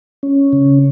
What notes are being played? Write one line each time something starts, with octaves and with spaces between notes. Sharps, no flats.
C#4
C#3